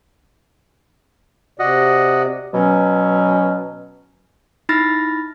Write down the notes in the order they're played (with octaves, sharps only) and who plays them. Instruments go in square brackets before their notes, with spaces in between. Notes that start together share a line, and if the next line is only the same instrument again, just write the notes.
[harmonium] C3 D5 [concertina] F#4 D#5
[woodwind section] B2 F#3 C#4
[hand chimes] D#4 E4 B5 F6 A6 A#6